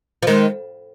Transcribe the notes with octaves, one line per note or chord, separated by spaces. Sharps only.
F3
D#3 G#3